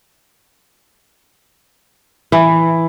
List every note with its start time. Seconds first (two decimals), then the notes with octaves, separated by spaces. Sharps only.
2.32 E3